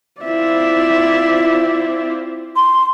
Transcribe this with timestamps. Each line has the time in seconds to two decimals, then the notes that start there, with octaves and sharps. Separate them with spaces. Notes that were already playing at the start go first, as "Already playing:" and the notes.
0.21 C4 E4 F4 D5 E5
2.56 C6